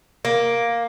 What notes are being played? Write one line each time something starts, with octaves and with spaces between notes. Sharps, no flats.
A#3